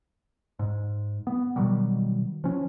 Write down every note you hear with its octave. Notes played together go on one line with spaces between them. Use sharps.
G#2
B3
B2 D#3 F#3 G3
F3 C#4